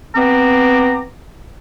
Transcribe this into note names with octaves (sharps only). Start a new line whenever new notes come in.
B3 C4 A#5 D6